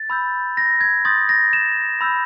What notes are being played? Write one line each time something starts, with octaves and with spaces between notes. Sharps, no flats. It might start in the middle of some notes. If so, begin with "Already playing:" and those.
Already playing: A6
B5 E6 G6
A#6
G#6
C6 D#6 G6 A6
A#6
E7
B5 E6 G6